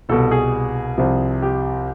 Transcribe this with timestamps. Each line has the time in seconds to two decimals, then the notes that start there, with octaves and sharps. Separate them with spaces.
0.09 C2 B2 A4
0.31 G#4
0.98 C2 C3 F3
1.42 G4